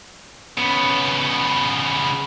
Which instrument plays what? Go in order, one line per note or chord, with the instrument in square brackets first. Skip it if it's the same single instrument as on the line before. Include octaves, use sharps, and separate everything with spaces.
[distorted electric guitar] C#3 B3